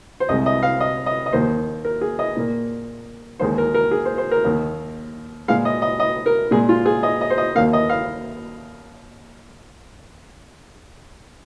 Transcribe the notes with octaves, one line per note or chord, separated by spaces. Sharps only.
C5
C2 C3 G#3 D#5
D#5
F5
D#5
D#5
D#5
D#2 D#3 A#3 C5
A#4
G#4
D#5
A#2 A#3
D#2 D#3 G#3 C5
A#4
A#4
G#4
C5
C5
A#4
D#2 D#3 A#3
A#2 G#3 F5
D#5
D#5
D#5
A#4
A#2 G#3 G#4
F4
G#4
D#5
D#5
C5
D#5
D#2 D#3 A#3 F5
D#5
F5